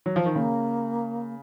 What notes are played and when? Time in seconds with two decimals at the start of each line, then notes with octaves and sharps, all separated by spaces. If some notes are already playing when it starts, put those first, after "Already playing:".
0.06 F#3
0.16 F3
0.26 D#3
0.35 C#3 A#3